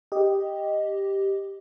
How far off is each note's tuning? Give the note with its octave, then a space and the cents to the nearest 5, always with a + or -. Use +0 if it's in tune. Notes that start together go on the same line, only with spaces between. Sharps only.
G4 +0 D#5 +0